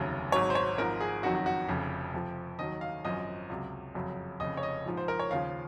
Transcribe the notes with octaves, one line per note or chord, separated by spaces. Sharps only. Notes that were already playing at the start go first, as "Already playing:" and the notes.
Already playing: F1 D#2 C#3 F#3
G#1 G#2 F#3 C#5
C5
C#5
G#1 G#2 F3 A#4
G#4
F#1 F2 D#3 F#3 F#4
F#4
F#4
F1 F2 C#3
F2 C3 F3
D#2 D#3 F#3 D#5
F5
G#1 F#2 F3 D#5
C#2 C3 F#3
F#1 F2 C#3 F#3
F1 F2 C#3 D#5
C#5
D#5
A#1 G#2 F3
C5
A#4
C#5
D#2 C#3 F3 F5